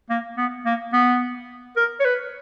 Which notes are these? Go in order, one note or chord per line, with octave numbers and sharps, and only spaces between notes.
A#3
B3
A#3
B3
A#4
C#5
B4